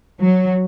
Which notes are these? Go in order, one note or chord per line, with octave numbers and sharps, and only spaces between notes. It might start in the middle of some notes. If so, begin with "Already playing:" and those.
F#3